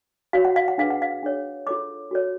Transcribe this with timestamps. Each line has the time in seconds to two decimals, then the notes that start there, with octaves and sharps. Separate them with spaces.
0.33 F#4 C#5 F5
0.45 F#5
0.56 F5
0.68 F#5
0.78 D4 G#4 B4 F5
0.90 F#5
1.02 F5
1.22 D4 G#4 C#5
1.67 F4 A4 C#5 D6
2.11 F#4 A4 C#5